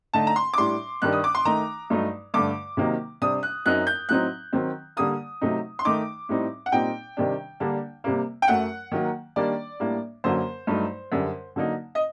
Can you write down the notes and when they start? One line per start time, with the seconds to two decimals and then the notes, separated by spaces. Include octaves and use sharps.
0.14 D3 A3 D#4 A5
0.27 A#5
0.36 C6
0.54 D6
0.58 A2 G3 D4 C6
1.02 G2 D#3 G3 D4 F#6
1.13 D#6
1.24 D6
1.35 C6
1.45 D#3 A3 D#4 A#5
1.90 G2 F#3 A3 D#4
2.34 G2 D3 A3 D6
2.77 C3 D#3 F#3 A#3 D#4
3.22 C3 G3 D4 D#6
3.43 F#6
3.66 F#2 F#3 C4 D#4 F#6
3.87 G6
4.09 A2 F#3 C4 D#4 F#6
4.53 D#3 F#3 C4
4.97 D3 G3 A#3 D#6
5.41 C3 F#3 A3 D#4
5.79 C6
5.85 D#3 A3 D#4 D6
6.29 A2 G3 C4 D#4
6.66 F#5
6.72 A#2 G3 C4 D#4 G5
7.17 C3 D#3 G3 D4
7.60 D3 G3 A#3 D4
8.04 C3 G3 A#3
8.42 G5
8.48 F#2 F#3 A3 F#5
8.92 D#3 F#3 A#3
9.36 D#3 G3 A#3 D4 D5
9.80 A2 G3 A#3 D4
10.24 F#2 D3 F#3 A#3 C5
10.67 G2 F#3 A3 D#4
11.12 F#2 D3 G3
11.56 D3 F#3 A#3 D#4
11.95 D#5